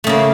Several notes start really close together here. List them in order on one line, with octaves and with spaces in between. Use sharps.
A3 C#3 A#3